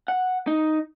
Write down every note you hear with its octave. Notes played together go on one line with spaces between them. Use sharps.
F#5
D#4